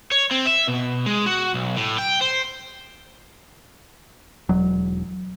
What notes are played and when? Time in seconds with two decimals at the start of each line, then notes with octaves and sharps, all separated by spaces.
0.11 C#5
0.31 C4
0.46 E5
0.68 B2
1.06 G#3
1.26 F#4
1.54 B1
1.77 A2
1.99 G5
2.21 C5
4.49 E1 F#3